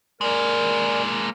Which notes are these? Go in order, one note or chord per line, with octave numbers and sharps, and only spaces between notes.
G#3 A#3 A#4 D5 G#5